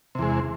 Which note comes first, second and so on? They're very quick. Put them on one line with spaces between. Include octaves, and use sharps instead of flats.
C3 E2 G#3